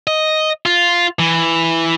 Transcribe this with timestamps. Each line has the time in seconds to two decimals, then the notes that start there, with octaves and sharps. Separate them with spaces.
0.07 D#5
0.66 F4
1.19 E3